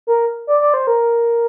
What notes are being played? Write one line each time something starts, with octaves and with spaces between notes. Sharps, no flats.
A#4
D5
D5
C5
A#4